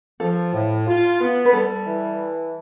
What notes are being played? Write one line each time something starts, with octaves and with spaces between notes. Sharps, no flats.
F3 A4
A2
F4
B3
B4
G3 A4
E3